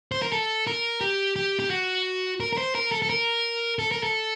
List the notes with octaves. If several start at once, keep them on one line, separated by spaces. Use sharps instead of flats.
C5
A#4
A4
A#4
G4
G4
G4
F#4
A#4
A#4
C5
A#4
A4
A4
A#4
A4
A#4
A4